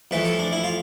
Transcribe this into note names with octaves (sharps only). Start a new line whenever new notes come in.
F2 E3 A3 B4
A4
D4
E4
F4